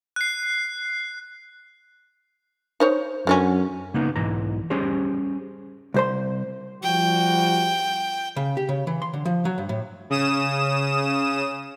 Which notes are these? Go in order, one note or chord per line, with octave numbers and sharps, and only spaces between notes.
F#6 C7
D#4 C5 C#5
F#2 D3 F#3 C#4
C#3 A#3 B3 D#4
B1 G#2 E3 A#5
G3 C#4 G4 G#4 C5 C#5
C2 C5 C6
F3 G3 F#4 G5
C#3
G4
C#3
E3
C6
D3
F3
F#3
G2
A2
C#3 D#6 E7